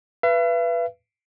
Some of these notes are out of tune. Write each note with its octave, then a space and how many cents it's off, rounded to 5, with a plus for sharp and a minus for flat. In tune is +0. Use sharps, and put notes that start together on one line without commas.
B4 +0 E5 +45